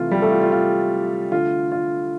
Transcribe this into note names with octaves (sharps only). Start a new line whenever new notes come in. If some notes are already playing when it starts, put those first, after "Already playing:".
Already playing: C3 E3 A3 F4
G3 G4
A3 A4
F4
F4
F4
D3 A3 F4
F4